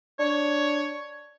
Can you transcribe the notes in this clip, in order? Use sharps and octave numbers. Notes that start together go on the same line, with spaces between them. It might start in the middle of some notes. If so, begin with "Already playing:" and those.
D4 C#5